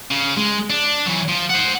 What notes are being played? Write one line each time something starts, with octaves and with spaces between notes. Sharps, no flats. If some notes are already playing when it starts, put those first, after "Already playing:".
C#3
G#3
D4
E3 F#3
F3
C5 F#5